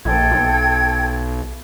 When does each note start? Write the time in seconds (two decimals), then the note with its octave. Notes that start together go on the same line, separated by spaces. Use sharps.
0.05 A#1 A4 G5 G#6
0.31 B1